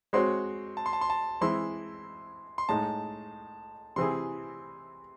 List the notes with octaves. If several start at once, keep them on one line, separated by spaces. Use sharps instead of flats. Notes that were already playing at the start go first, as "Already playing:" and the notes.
G#3 C4 F#4 C#5 C6
A5
C6
A5
C6
A5
E3 G#3 C4 E4 C6
C6
A2 G#3 D#4 A5
C3 E3 C4 E4 G#4 C6